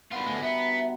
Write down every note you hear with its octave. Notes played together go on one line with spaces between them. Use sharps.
G2 B2 D#3 B3 F4
D2 G#3 A3
D#3 B3 E5 A5